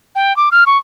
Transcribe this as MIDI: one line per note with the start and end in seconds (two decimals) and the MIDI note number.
0.15 0.35 79
0.36 0.49 86
0.51 0.64 89
0.66 0.78 85